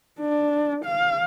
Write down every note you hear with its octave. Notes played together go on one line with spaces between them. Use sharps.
D4
F5